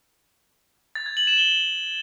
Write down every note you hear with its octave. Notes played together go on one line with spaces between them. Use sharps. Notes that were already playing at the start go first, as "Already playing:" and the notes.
A6
G#6
F#7
E7
G7